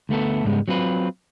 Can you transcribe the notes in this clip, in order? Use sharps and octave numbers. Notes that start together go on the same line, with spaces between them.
D2 A3 B3 A4
C#2 G#2 G3 G#3 B3
F#3 C4 F4 B4